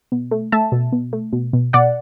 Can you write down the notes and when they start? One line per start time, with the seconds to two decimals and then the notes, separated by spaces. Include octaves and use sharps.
0.12 B2
0.31 A3
0.52 A3 E5 A5
0.72 B2
0.92 B2
1.13 A3
1.33 B2
1.53 B2
1.73 B2 D5 F#5